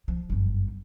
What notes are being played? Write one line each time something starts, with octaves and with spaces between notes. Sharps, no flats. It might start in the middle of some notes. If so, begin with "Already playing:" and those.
F3
G1 F#2